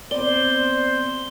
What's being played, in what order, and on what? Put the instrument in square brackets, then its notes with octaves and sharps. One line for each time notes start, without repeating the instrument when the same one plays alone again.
[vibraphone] B3 C4 [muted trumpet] C5 [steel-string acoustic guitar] D5 [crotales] G7